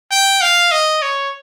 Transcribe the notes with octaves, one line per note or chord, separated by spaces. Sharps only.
G5
F5
D#5
C#5